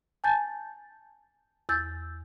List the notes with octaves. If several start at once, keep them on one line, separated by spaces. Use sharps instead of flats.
G#5 A5 G6 A6
E2 E6 G6 A6